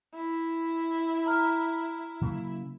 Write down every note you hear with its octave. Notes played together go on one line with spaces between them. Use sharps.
E4
A#5 F6
C#3 F#3 A#3